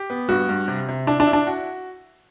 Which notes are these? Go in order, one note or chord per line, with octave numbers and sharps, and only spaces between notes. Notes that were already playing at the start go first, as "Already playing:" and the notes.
Already playing: G4
B3
G2 F#4
G2
C3
C3
D4 E4
D4
E4
D4
F#4